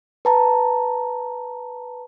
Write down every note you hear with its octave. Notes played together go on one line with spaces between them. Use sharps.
B4 A5 A#5